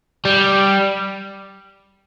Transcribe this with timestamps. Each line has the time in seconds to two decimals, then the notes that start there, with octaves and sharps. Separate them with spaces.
0.25 G3